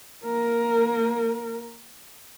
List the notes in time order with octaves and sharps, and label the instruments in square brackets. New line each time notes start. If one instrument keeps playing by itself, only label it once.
[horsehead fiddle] A#3 A#4